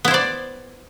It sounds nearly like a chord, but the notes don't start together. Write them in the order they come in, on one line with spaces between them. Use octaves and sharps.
B3 E4 C5 D5